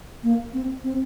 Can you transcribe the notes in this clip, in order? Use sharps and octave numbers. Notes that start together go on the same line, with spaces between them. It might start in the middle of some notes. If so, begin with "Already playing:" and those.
A#3
C4
C4